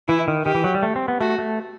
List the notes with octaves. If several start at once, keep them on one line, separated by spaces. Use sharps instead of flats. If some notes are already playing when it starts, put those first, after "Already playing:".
E3 E4
D#3
D#3 G4
E3
F#3
G3
A3
C4
B3
A3 F#4
A3